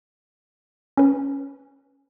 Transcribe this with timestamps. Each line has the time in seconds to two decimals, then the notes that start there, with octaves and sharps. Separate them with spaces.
0.97 C#4 B4